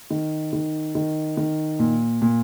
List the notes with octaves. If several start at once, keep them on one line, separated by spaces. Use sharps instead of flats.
D#3
D#3
D#3
D#3
A#2
A#2